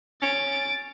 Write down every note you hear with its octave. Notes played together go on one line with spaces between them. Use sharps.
C#4 A6 D7